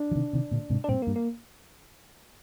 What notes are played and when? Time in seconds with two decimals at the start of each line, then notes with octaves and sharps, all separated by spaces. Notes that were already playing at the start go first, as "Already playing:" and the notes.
Already playing: D4
0.11 F3
0.15 C3 D#3
0.33 C3 D#3
0.51 A#2 D3
0.70 G#2 C3
0.84 D4
0.88 G2 A#2 C4
1.02 A#3
1.07 G2
1.16 A#3